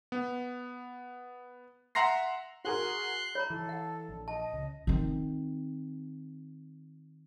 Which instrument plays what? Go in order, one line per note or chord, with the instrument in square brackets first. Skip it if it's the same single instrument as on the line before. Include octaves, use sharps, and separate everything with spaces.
[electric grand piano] B3
E5 F#5 A#5 C6 A#6 C7
[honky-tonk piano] F#4 G#4 A#4 [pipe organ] C6 F#6
[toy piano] C#5 A#5 [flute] B5
[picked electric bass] E3 [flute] A4
[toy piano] F#5
[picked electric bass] A#1
[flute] D#5 [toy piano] A5
[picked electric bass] C#2
[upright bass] D#3 C4